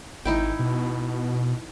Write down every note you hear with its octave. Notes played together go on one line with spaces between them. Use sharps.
G#1 D#4 E4 G5
B2